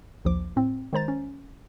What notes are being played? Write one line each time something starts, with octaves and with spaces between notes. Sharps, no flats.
A#1 D#2 F3 D6
A2 C4
D#3 G#3 C5 A#5 A6
C#4